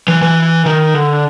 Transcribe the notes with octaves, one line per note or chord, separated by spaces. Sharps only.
E3
E3
D#3
D3